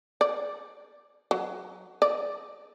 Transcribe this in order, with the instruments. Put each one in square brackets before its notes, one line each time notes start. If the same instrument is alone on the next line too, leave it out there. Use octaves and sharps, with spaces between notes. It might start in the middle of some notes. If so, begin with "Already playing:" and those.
[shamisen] D5
F#3
D5